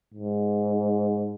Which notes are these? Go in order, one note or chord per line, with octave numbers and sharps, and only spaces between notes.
G#2